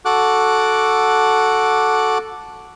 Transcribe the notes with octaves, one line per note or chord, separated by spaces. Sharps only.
F#4 A4 F#5 D6 F#6